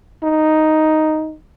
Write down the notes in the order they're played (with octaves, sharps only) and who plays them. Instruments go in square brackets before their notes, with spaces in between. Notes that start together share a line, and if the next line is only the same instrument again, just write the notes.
[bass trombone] D#4